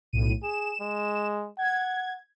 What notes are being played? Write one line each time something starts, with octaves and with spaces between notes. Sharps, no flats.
B1 A2 D#7
G#4 E7
G#3
F#5 G#6